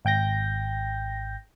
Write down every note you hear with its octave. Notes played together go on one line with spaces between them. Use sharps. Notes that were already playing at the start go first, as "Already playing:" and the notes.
G#1 G5 G6 A#6